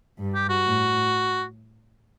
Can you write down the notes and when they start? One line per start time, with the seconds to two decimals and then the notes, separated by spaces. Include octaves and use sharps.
0.19 G2
0.35 G4
0.49 F#4
0.65 A2